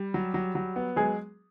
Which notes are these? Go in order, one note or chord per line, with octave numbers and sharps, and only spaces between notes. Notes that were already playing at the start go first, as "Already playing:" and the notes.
Already playing: G3
F#3
F#3
F#3
B3
F#3 G#3 G#4